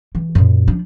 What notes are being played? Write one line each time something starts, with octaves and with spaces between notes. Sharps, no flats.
E3
F#2 A#2
F3 D4